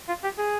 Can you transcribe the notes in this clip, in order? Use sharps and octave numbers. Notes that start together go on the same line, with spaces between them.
F4
G4
G#4